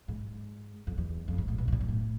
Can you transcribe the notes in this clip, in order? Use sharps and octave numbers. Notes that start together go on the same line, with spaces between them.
G#2
F2
E2
F2
G#2
A2
B2
G#2
A2
G#2
A2